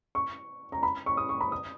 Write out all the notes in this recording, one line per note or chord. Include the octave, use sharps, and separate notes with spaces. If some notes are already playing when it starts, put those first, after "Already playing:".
C#6
A#5
B5
C#6
D#6
C#6
B5
D#6